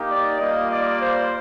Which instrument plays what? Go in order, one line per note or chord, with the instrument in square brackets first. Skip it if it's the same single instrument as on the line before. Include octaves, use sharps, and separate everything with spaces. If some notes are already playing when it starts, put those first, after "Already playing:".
Already playing: [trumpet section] A#3 D#4 G4
D5
G3 A#3 F4 D#5
D5
C5